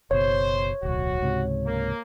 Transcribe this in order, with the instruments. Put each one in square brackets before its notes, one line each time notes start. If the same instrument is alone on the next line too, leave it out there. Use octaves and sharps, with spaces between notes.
[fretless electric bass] F#1 B2 [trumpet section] C5 [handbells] C#5
[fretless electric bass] D1 B1 [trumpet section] F#4
[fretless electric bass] C#2 G#2 C3
[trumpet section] A#3